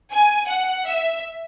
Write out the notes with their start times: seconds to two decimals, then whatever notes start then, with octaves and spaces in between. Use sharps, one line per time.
0.11 G#5
0.49 F#5
0.87 E5